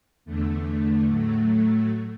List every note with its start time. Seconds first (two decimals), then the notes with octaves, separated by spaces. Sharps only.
0.25 E2 D3 A3
1.08 A2 F#3 A3